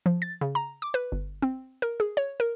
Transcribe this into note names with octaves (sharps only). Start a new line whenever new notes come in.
F3
A6
C#3
A#5
D6
B4
G1
C4
A#4
G#4
C#5
A#4